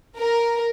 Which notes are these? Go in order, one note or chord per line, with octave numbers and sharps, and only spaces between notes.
A#4